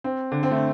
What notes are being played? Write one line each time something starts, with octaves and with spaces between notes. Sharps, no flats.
C4
D3
C4
A3